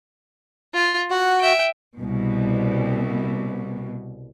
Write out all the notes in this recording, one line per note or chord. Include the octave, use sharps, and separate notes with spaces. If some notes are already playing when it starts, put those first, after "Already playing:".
F4
F#4 F#5
E5 G5
C2 B2